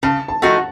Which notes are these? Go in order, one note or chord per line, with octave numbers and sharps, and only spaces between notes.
C#3 A5
A5
F3 A3 D#4 F#4 F#5